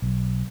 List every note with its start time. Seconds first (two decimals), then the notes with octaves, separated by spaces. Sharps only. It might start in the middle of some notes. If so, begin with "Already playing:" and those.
0.02 B1